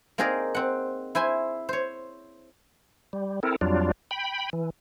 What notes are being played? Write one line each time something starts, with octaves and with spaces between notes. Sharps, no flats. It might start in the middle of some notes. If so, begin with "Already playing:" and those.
A#3 C4 D#4 G#4 A#4 D5
C4 F#5
E4 C5 G#5 C6
C5 C#5
G3
C4 E4 A4 A#4
F2 F#3 G3 D4 F4
G5 B5
E3